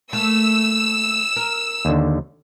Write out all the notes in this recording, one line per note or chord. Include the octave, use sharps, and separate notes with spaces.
A3 A#3 E6
A#4
D#2 D3